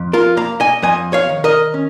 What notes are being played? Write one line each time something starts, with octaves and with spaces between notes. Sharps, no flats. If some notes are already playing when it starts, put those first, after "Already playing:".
Already playing: F2
F4 A#4
A#3 F5 A#5
D#5 G#5
F2 D#5 G#5
C#5 F5
D#3
A#4 D#5
C#4